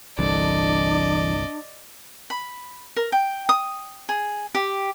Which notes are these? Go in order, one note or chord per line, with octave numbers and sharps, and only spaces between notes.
G1 C2 E3 D4 A4 D5 D#5
B5
A#4
G5
D#6
G#4
G4